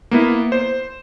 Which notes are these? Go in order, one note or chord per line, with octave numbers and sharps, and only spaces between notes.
A#3 B3 E4
C5